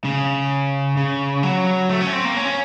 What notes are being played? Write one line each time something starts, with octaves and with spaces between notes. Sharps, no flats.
C#3
C#3
F#3
A3
C#4
C4
A#3
C#4